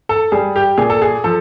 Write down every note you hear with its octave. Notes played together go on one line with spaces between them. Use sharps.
A4
G3 G#4
G4
A#2 G#4
A4
G#4
F3 A4